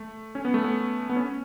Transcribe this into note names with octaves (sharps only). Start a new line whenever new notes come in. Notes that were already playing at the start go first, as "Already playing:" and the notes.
Already playing: A3
C#4
B3
A3
B3
B3
C#4